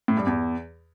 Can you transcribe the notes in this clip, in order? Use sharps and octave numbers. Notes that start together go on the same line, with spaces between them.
A2
G2
E2